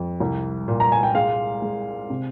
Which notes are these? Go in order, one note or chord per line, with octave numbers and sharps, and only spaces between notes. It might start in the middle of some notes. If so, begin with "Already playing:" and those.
Already playing: F2
C2
A#2
A#5
G#5
G5
G#3 F5
G#3
C3